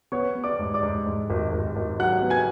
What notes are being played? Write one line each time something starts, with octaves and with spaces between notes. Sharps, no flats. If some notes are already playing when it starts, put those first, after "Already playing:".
B3 C#5 C#6
B3
D5 D6
G#2
D5 D6
G#2
G#2
G#1
G#1
G#1
F#3 F#5 F#6
B3
G#5 G#6